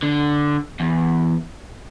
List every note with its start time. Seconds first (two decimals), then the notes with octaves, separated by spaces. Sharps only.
0.03 D3
0.80 E2